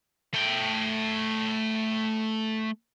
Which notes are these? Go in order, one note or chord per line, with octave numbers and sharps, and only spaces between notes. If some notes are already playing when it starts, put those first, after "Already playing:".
A3 G5